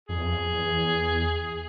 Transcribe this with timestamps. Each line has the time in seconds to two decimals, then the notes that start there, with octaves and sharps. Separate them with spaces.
0.09 F2 G#4
0.17 E2
0.25 F2
0.54 E2